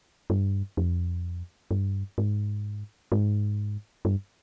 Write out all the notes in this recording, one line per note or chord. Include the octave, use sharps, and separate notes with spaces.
G2
F2
G2
G#2
G#2
G2